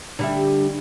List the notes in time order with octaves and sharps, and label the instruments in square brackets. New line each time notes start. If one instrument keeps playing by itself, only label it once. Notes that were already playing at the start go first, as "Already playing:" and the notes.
[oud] D3 G3 E5